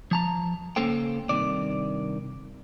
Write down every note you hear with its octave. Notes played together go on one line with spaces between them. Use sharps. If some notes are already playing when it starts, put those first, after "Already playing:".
F3 A5 A#5
C#2 A#3 C#4 A4 C5 G5
G2 C3 D#3 D5